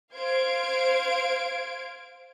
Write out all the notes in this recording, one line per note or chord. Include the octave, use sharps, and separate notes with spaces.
C5 F5 G#6 D7